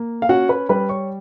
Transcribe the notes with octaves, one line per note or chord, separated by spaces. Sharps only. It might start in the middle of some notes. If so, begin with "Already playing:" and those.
Already playing: A#3
F5
C#4 F#4 F#5
B4 B5
G3 B4 B5
C#5 C#6